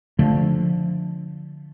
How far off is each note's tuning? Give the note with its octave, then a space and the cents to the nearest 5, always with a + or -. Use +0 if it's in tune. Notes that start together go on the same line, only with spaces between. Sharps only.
D3 +0 F3 +10 A3 -5